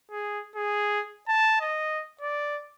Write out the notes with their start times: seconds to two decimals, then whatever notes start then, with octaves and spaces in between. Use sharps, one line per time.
0.11 G#4
0.56 G#4
1.28 A5
1.61 D#5
2.21 D5